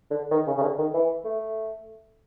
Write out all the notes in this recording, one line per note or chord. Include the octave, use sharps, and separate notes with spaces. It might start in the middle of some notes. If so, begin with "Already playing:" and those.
D3
D#3
C#3
C#3
D3
D#3
E3
A3